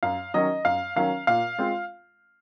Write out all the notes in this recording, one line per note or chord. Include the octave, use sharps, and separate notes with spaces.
F#2 F5
D#3 F#3 C#4 D#5
F#2 F5
D#3 F#3 C#4 F5
A#2 F5
G#3 C4 F4